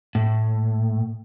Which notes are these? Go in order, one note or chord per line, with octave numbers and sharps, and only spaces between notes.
A2